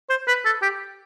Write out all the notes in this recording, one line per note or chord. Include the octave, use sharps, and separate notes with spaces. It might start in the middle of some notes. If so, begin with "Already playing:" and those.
C5
B4
A4
G4